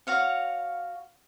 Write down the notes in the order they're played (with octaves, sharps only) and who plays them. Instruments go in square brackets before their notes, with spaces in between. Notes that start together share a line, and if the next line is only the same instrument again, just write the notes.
[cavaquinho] F#4 C#5 F5 F#5